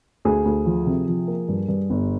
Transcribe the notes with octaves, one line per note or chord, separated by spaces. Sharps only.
D2 G#4
D2
F3
C3
F3
A#3
G2
G2
G1